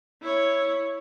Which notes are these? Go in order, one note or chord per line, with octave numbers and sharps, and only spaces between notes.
E4 C#5